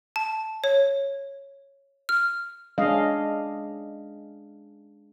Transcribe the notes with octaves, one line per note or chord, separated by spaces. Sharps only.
A5
C#5
F6
G#3 C#4 D4 D#5 F5